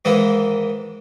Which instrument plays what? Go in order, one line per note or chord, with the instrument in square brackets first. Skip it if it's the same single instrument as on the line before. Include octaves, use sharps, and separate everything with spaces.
[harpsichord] G#2 D#3 E3 A#3 E4